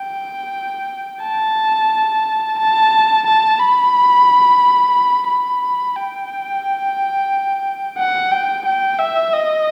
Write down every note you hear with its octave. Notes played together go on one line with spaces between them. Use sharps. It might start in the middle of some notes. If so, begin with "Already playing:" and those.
Already playing: G5
A5
A5
A5
B5
B5
G5
F#5
G5
G5
E5
D#5